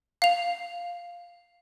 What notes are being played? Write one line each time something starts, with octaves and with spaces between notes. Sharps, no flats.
F5 F7